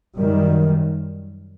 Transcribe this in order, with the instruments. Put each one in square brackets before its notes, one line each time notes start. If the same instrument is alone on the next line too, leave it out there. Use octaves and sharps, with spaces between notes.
[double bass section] F#2 D#3 G3